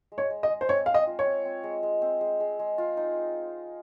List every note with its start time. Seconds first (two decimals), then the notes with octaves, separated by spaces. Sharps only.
0.12 G#3
0.18 C#5
0.31 G#3
0.43 D#5
0.50 G#3
0.61 C5
0.69 C4 C#5
0.86 C4 F5
0.94 D#5
1.07 F4
1.19 C#5
1.26 C4
1.45 C4
1.64 G#3
1.83 G#3
2.02 C4
2.21 G#3
2.40 G#3
2.59 G#3
2.78 F4
2.97 D#4